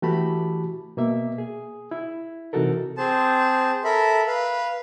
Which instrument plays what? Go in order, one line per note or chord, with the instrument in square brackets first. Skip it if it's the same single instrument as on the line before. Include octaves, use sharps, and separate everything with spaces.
[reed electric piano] E3 A3 F#4 G4 A5 B5
B2 A#3 E5
G#4
E4
C3 E3 D#4 F#4 A4 A#4
[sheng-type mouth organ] C4 G#4 C5 A5
A4 A#4 E5 B5
B4 F5